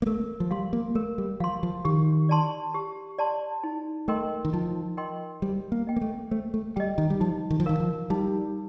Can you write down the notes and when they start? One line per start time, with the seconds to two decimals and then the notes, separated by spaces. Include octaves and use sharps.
0.02 A#3
0.06 A3 A#4
0.40 F3
0.51 G3 F5 C6
0.73 A#3
0.95 A3 A#4
1.18 G3
1.40 F3 F5 C6
1.63 F3
1.85 D#3 G4
2.29 D5 A5 C6
2.74 G4
3.18 D5 A5 C6
3.64 D#4
4.08 A3 A#4 D#5 G5 C6
4.45 D#3
4.53 F3 D#4
4.97 A#4 D#5 G5 C6
5.42 G3 C5
5.72 A#3
5.87 D#5 G5
5.96 A#3
6.01 A3
6.31 A3 C5
6.54 A3
6.76 G3 G5
6.80 D#5
6.98 D#3
7.10 G3
7.20 F3 D#4
7.51 D#3
7.60 F3
7.66 D#3 A#4 F5
7.80 F3
8.10 G3 D#4